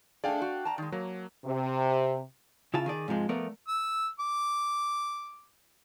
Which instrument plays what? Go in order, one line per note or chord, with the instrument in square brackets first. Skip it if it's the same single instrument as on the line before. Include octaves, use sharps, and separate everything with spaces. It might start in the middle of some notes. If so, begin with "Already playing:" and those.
[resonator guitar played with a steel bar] A3 D4 G#4 [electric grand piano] D5 F5 G5
[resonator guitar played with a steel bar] F#4
A5 A#5
D#3 G#3
[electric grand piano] F#3 [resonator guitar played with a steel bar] A#3
[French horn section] C3
[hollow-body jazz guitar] C#3 E4 F4 E5 A5
D#3 G#4 D5
G#2 C3 F3 G#3
F3 A3 B3 A#4 D5
[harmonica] E6
D6